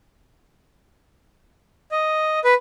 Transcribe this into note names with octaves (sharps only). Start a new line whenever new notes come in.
D#5
B4